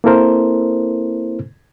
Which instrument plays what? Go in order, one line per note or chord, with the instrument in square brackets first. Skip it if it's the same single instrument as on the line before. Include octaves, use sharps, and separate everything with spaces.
[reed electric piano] A#3 C4 E4 A4 A#4 C5